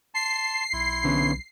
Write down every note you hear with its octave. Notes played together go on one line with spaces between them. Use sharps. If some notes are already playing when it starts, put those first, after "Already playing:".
A5 C6 C7
B1 E4 C6
D3 B3 C#4